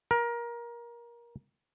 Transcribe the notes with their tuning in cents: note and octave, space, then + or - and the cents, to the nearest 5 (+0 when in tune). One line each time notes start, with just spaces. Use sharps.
A#4 +20